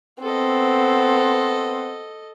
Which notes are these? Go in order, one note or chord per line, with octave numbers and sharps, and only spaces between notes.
B3 C4 A4 D#5